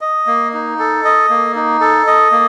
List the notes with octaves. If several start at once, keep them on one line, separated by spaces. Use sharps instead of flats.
D#5
A#3
D#4
A4
D#5
A#3
D#4
A4
D#5
A#3